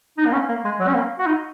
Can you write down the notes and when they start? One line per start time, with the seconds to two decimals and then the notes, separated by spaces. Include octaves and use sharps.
0.18 D#4
0.26 A#3
0.33 C#4
0.49 A#3
0.65 G#3
0.79 F#3
0.88 C#4
0.94 A#3
1.19 F#4
1.26 D#4